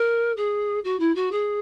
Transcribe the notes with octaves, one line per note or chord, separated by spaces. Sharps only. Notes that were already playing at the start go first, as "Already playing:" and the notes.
Already playing: A#4
G#4
F#4
E4
F#4
G#4